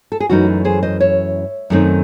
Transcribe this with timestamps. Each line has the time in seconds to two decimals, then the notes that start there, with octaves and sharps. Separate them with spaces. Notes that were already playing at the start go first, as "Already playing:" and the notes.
0.12 A4
0.20 G#4
0.29 F#2 E3 A3 D#4 F#4
0.65 G#4 C5
0.83 C5 D#5
1.00 C#5 E5
1.70 F#2 D#3 A3 C4 D#4